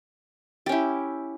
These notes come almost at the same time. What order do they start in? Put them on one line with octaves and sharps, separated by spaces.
G4 C#4 E4